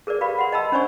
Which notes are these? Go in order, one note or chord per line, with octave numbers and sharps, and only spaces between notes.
G#4 A#4 B4 D5
G4 B4 F5 B5
F#5 C6
D#5 G5 A5 B5 E6
C#4 D4 C5 D5 G#5 C#6